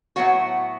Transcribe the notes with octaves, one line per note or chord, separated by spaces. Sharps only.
A2 F#3 B3 F#4 F#5